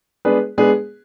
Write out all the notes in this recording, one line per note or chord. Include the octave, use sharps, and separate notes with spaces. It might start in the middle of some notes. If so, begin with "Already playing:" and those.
G#3 B3 D4 G#4 B4
G#3 B3 D4 G#4 B4